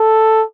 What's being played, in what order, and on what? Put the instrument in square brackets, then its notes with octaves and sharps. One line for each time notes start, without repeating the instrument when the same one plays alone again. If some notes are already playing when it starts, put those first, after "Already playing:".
Already playing: [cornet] A4